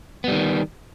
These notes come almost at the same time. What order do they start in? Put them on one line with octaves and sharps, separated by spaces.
B3 G3 D#3